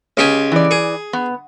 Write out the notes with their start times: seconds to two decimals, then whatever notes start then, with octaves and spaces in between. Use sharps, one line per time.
0.17 C#2 G4 G#5
0.52 E3 D5
0.71 G#4
1.13 B3